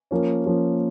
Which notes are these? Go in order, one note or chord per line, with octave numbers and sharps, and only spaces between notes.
F3 A#3 C#4
F3 A#3 C#4